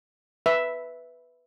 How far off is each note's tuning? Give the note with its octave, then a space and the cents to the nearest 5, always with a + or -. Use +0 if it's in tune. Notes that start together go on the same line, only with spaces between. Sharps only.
B4 +0 E5 +0